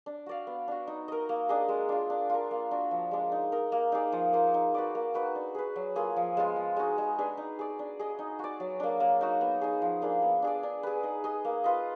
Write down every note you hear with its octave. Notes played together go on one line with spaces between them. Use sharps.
D4
F#4 D5 F5
B3
D4 F#4
D#4
A#4 D#5
A#3
D4 G#4 D#5
G#3
D4 F4
D4
F4 A#4
A#3
D4 F#4
F3
G#3 D4
D#4
A#4 D#5
A#3
D#4 G#4 D5
F3
A#3 F4
D#4
F#4 B4 D5
A#3
D#4 F#4 B4
D4
G#4 B4
F#3
A#3 F4 G#4
F3
G#3 B3 F4
F3
G#3 D#4 F#4
G#3
D4 G#4 B4
D#4
G#4 D5
D4
G#4 D#5
D#4
F#4 D5
F#3
A#3 D4
A#3
D#4 F#4
B3
D#4 G#4
F3
A#3 D4 G#4
B3
D4 G#4 D5
D4
G#4 B4
D#4
G#4 D#5
A#3
F4 B4 D#5